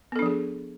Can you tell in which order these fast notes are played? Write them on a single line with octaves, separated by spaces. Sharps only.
B3 A4 D4 F3 G#4